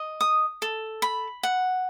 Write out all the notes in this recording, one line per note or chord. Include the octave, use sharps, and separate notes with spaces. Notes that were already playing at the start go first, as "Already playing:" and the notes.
Already playing: D#5
D#6
A4
B5
F#5